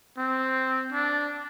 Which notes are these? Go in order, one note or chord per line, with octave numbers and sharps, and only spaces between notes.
C4
D4